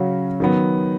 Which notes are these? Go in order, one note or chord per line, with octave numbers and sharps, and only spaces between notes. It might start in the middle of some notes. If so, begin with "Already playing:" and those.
Already playing: C#3 F#3 C#4 F#4
D#3 F#3 B3